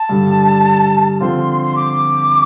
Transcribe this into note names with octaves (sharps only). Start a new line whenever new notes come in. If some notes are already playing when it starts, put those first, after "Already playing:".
Already playing: A5
G2 D3 G3
D3 F3 C4 F4 C6
C6
D6